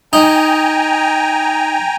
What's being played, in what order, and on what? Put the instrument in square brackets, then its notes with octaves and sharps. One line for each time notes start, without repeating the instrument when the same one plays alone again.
[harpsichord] D#4 [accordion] G5 G#5 A#5